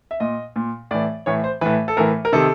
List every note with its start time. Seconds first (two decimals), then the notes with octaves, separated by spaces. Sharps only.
0.11 E5
0.20 A#2 D#5
0.56 A#2
0.91 A2 E3 D5
1.26 A2 E3 C#5
1.44 C5
1.61 A2 E3 B4
1.88 A4
1.97 A2 E3 A#4
2.25 A#4
2.33 C3 D#3 A4